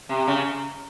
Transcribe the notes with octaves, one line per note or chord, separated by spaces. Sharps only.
C3
C#3